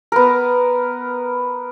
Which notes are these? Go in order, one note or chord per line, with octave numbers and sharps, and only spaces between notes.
B3 A#4